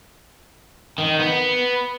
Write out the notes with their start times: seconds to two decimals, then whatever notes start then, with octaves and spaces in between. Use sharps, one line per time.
0.98 D#3
1.19 B3